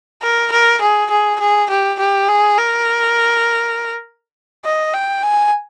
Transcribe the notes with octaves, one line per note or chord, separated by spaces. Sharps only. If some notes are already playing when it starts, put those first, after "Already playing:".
A#4
A#4
G#4
G#4
G#4
G4
G4
G#4
A#4
D#5
G5
G#5